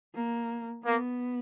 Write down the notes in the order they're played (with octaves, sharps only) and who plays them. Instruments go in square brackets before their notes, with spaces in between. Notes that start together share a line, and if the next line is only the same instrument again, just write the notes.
[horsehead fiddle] A#3
[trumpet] A#3 [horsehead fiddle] B3